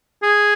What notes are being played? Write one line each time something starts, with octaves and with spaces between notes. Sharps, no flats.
G#4